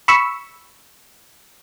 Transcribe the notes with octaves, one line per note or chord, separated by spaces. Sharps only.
B5 C#6 E6